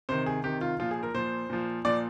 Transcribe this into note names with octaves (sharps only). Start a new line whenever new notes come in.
C3 D#3 C5
G#4
C3 D#3 G4
F4
A#2 F3 F4
G#4
A#4
A#2 F3 C5
A#2 F3
A#2 F3 D5